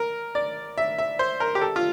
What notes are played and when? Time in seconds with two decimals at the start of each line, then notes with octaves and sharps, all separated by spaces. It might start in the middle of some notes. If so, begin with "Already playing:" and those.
Already playing: A#4
0.35 D5
0.78 E5
0.98 E5
1.19 C5
1.40 A#4
1.55 G4
1.61 A4
1.76 F4